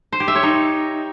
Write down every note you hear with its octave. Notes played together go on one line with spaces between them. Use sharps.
C5
G4
E5
C#5
D#4